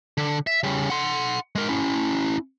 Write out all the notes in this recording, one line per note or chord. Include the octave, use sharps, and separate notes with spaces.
D3
E5
C#3 G3
F#5 C6
G#3 A#4
C#4 E4